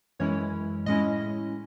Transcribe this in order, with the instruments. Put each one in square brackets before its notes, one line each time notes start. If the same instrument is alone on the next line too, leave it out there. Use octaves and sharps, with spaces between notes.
[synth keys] F#2 E3 G#3 C#4 E4 C#5
A2 G#3 C#4 E4 D#5